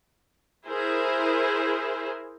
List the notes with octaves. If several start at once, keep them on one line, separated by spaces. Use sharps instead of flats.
E4 G#4 A#4 C5